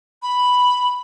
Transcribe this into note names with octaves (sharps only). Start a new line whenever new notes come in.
B5